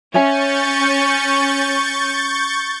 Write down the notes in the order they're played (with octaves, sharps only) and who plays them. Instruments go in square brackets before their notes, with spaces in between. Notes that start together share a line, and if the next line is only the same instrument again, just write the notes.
[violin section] C#4 [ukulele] C#5 E5 G#5 [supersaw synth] C#6 G6 A6